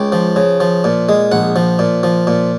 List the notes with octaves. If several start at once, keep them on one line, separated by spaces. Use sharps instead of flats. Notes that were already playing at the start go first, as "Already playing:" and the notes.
Already playing: C#2 G5
F3
C#3
F3
A#2
G#3
A#1 F#5
F3
A#2
F3
A#2